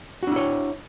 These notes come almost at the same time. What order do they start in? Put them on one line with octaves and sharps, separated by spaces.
F#4 D4 E4 C#5